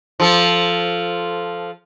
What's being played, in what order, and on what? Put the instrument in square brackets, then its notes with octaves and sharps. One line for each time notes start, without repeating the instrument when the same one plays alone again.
[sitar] F3 A4